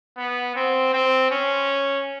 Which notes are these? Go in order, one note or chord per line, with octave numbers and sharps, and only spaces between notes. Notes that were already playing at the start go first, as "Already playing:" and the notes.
B3
C4
C4
C#4